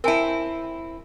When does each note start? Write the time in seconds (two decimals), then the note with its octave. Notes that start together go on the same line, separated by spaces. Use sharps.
0.04 C4 E4 A#4 G#5 A5